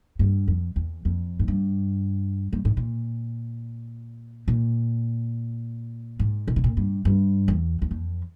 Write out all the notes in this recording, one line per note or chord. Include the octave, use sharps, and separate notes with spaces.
G2
F2
E2
F2
G#2
G2
G2
G#2
A#2
A#2
G#2
A#2
C3
A#2
G2
G2
E2
E2
F2